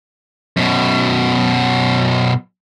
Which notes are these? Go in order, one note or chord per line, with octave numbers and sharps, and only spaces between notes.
F#2 B2